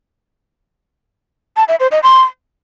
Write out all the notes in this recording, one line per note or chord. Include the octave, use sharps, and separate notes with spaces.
A5
E5
C5
D#5
C6